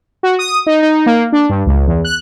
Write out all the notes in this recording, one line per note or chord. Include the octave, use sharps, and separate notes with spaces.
F#4
D#6
D#4
D#4
A#3
D4
G2
C#2
E2
F#6